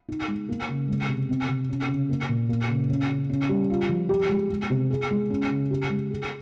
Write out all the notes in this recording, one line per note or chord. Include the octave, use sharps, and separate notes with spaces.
D#4
G#3
A#3
C#3
G#3
C3
C4
C3
C#4
C#3
A#3
A#2
A#3
C#3
C#4
C#3
C#4
G3
F4
F3
G4
G#3
G#3
C3
G#4
G#3
C#4
C#3
G4
G#3
G#4